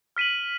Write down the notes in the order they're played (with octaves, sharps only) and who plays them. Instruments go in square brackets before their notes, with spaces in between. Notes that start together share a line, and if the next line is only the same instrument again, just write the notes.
[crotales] F6 B6 D#7 F#7